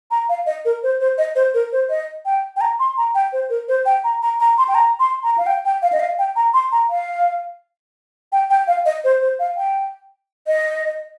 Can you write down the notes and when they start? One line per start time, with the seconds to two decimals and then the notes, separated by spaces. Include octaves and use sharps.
0.11 A#5
0.29 F5
0.46 D#5
0.65 A#4
0.83 C5
1.01 C5
1.18 D#5
1.35 C5
1.54 A#4
1.72 C5
1.90 D#5
2.25 G5
2.56 G5
2.61 A#5
2.79 C6
2.97 A#5
3.15 G5
3.33 C5
3.50 A#4
3.68 C5
3.86 G5
4.04 A#5
4.22 A#5
4.40 A#5
4.58 C6
4.68 G5
4.75 A#5
5.00 C6
5.23 A#5
5.38 F5
5.46 G5
5.65 G5
5.82 F5
5.92 D#5
5.99 F5
6.19 G5
6.36 A#5
6.54 C6
6.72 A#5
6.90 F5
8.32 G5
8.50 G5
8.67 F5
8.85 D#5
9.04 C5
9.21 C5
9.39 F5
9.57 G5
10.47 D#5